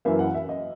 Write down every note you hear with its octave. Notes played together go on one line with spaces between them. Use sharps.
F#2 E3 A#3 E4 E5
F#5
E5
D#5